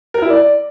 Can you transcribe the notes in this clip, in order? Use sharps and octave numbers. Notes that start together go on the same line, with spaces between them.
A#4
E4
D5